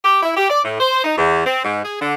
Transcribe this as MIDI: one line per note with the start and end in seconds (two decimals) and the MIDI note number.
0.04 0.22 67
0.23 0.35 64
0.37 0.50 67
0.50 0.60 74
0.65 0.77 45
0.80 1.04 72
1.05 1.18 63
1.18 1.44 40
1.46 1.61 60
1.64 1.83 44
1.85 1.98 68
2.00 2.14 50